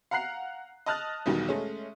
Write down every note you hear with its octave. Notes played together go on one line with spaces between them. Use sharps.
F5 F#5 A#5 F#6 C7
D#5 A5 D#6 F6 F#6 A6
B1 E2 B2 D#3 G3
G#3 A3 C#4